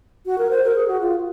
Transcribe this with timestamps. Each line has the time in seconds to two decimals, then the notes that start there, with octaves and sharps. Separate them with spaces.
0.26 F#4
0.38 A#4
0.51 C5
0.63 A#4
0.75 G#4
0.88 F#4
1.00 F4